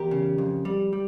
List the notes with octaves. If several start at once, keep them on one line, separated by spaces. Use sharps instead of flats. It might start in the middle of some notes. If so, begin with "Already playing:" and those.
Already playing: E2 G4 A#4
C#3
F2
G3
G3